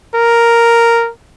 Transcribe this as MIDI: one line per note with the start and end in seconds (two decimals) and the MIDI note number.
0.15 1.10 70